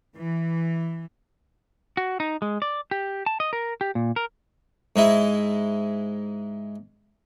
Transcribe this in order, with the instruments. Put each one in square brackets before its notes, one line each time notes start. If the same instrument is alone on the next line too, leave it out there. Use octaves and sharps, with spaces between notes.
[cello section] E3
[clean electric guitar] F#4
D#4
G#3
D5
G4
A5
D#5
A#4
G4
A#2
A#4
[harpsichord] G#2 G#3 E4